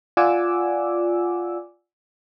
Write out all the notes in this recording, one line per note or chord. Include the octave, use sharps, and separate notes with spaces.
F4 D5 F#5 G#5 D6 E6